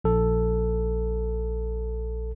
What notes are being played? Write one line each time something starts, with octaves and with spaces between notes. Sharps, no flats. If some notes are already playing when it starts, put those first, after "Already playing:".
A#1 A4